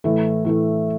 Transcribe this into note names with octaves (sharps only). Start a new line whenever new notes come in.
A2 E3 A3
A2 E3 A3